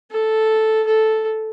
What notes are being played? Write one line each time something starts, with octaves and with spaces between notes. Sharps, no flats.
A4
A4